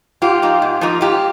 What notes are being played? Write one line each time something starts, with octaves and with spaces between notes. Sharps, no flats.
G#2 F4 G4
F3 A#3 D#4
G#2
F3 A#3 D#4
G#2 F4 G4